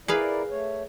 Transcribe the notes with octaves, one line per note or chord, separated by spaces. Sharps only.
E4 G#4 A#4 B4 D5 F5
A3 C#5